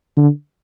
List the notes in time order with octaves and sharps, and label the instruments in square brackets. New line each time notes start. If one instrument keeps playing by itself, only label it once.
[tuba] D3